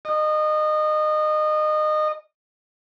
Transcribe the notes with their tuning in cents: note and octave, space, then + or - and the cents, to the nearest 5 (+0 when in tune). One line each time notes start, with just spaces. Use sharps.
D#5 -25